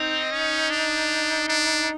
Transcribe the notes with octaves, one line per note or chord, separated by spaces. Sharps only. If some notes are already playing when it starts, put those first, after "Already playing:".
Already playing: C4 D#4
C#4
D4
D4